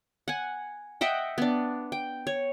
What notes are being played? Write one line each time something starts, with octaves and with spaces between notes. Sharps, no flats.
F#5 G#5
D#5 E5 F#5 G5
B3 D4
G5
C#5